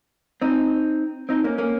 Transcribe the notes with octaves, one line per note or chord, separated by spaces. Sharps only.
C4 D#4
C4 D#4
A#3 C#4
A#3 C#4